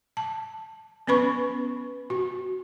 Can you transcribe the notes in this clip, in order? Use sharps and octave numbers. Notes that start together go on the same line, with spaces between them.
A5
B3 C#4 B4 B5 C#6
F#4